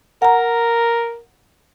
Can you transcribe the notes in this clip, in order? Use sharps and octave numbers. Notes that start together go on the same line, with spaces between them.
A#4 F#5 A#5